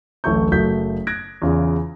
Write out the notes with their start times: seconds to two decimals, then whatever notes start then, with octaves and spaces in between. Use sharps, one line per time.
0.24 D1 A1 A3 C#6 G6
0.52 F#1 A3 F#4 G6 B6
1.07 F#6 G#6 A#6 D7
1.42 E2 C#3 F4